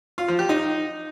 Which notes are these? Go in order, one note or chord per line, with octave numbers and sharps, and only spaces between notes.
F4
F3
G4
D#4